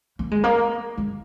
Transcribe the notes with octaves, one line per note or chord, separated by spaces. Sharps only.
A#3
G#3
A#3
G#3